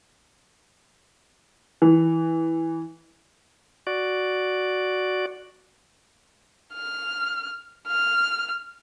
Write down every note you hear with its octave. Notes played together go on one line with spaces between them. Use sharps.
E3
F#4 D5
F6
F6